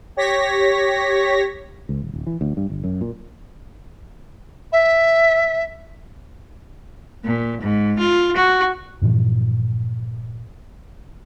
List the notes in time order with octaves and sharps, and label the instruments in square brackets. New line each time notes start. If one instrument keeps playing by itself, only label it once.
[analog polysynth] G4 C#5 A#6 B6
[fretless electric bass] C#2
D#1
D1
E3
D2
G2
G1
F#2
A#2
[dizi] E5
[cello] A#2
G#2
F4
F#4
[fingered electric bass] G2 A#2 E3 F3